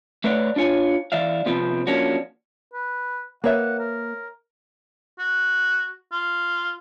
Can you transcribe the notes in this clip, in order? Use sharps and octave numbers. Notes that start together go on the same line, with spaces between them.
A3 B4 C#5 D5 F#5
D4 F4 C#5 G#5
E3 D5 E5 F5
C3 F3 B3 C4
F3 A#3 C#4 D4 F#4
B4
A#3 B4 C#5 E5 F#5
A#4
F#4
F4